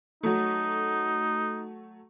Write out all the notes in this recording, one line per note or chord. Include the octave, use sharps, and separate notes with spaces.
F#3 A3 D#4